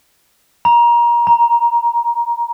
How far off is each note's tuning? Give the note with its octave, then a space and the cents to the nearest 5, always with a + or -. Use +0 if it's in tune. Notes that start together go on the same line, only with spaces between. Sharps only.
A#5 +25
A#5 +10